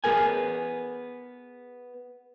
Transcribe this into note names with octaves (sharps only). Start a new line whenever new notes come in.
B3 G#4 A#4 G#5